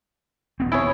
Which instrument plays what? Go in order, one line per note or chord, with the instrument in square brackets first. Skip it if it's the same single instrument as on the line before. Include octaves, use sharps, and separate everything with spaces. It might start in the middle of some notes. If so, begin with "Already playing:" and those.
[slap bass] D#1 B3 C4
[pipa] E4 G#4 C#5